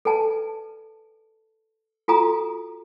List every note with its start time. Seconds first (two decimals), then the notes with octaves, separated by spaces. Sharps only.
0.05 A4 B4 D5 G#5 A5
2.08 F4 F#4 A4 G#5 A#5 D#6